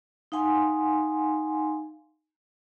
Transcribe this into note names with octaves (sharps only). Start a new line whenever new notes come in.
D#4 F5 F#5 G#5 C6